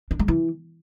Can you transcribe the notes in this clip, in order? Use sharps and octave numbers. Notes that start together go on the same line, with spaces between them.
D4
G#3
E3